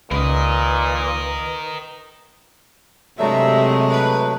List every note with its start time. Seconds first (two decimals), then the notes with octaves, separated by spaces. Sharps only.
0.11 C#2 A#2 A#4 B4 D#5
3.19 G2 C3 F#3 G#3 A3 E5
3.91 B4